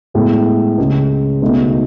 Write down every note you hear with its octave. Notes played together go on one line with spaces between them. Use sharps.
A2 G#3 B3
C#2 C#3 G#3
C#2 B2 A3 D#4